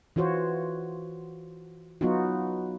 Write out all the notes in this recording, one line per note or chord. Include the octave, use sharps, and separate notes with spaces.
E3 F4 F#4 C5 C#5
F#3 B3 D#4 F4 F#4